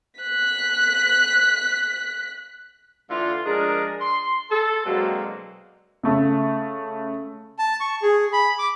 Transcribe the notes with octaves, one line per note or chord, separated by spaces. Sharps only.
F#6 B6
D3 E3 A3 F4
F3 G#3 D4 G#4 A#4
C6
A4
B2 D3 F#3 G#3 A#3 C4
C#3 A3
A5
C#6
G#4
B5
D6